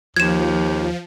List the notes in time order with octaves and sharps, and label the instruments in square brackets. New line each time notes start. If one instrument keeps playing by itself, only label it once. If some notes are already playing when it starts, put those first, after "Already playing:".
[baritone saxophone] D#2 [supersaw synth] F3 [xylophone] G#6 E7